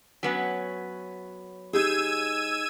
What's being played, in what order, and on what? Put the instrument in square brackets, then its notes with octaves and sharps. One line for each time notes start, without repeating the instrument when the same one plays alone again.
[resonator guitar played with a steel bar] F#3 B3 C#4
[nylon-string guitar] D#4 G4 G#4 [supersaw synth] E6 G#6 D#7